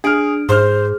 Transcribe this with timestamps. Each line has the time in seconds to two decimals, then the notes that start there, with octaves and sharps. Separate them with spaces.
0.04 D4 G#4 G#5 F6 D7
0.49 G#2 G#4 C5 C6 F6